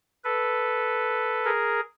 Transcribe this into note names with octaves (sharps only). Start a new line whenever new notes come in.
A4 B4
G#4 A#4